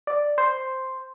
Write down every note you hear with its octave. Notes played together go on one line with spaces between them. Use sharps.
D5
C5